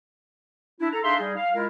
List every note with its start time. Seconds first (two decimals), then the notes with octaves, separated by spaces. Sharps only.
0.80 D4 E4
0.92 A4 A#5
1.04 D4 D#4 G#4 E5 F5 C6
1.19 G3 D#4 G#4
1.37 F5
1.55 G#3 E4 F4 A#4